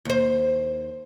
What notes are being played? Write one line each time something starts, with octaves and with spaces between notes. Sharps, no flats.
D#2 C5